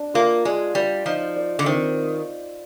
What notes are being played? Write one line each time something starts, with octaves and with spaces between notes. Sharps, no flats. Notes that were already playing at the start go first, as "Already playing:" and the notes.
Already playing: D4
A#3 F4
G#3 D5
G3 D5
F3 D#4
D5
D3
D#3 C4